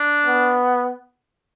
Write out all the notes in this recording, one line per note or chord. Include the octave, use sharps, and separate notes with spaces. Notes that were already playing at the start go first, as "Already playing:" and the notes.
Already playing: D4
B3